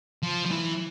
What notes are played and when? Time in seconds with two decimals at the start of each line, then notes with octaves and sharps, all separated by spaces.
0.23 F3
0.46 F3
0.51 E3